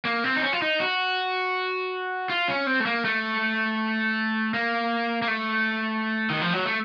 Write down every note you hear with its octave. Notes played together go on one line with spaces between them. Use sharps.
A#3
C4
D#4
C#4
F4
D#4
F#4
F4
C#4
C4
A3
A#3
A3
A#3
A#3
A3
D#3
F3
F#3
A3